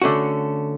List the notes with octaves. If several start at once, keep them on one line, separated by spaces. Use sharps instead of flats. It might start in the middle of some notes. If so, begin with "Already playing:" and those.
D3 A3 C#4 F#4